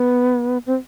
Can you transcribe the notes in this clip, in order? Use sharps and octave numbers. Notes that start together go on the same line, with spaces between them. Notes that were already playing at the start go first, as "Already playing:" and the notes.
Already playing: B3
C4